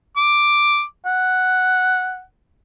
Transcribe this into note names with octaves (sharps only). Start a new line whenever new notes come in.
D6
F#5